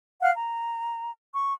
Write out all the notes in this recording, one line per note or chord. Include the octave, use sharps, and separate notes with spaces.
F5 F#5 F6 F#6
A#5
C#6